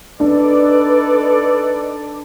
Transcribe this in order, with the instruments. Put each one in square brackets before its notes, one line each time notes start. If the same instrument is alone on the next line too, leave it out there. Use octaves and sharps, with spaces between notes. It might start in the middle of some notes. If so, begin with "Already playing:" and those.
[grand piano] D4 [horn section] D#4 A4 D5 [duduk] B4